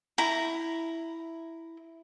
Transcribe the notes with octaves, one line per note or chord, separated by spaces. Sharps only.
E4 A#5